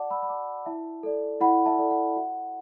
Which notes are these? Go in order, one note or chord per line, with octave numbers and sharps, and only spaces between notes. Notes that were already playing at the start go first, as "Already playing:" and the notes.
Already playing: F#4 D5 F#5 A5 D6
B5 E6
B5
D5 A5 D6
E4 E5 A5
A4 D5
E4 F#5 B5
E5 A5
A4 D5
F#5
F#4 F#5